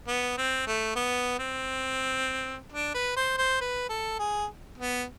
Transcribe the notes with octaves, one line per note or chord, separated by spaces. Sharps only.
B3
C4
A3
B3
C4
D4
B4
C5
C5
B4
A4
G#4
B3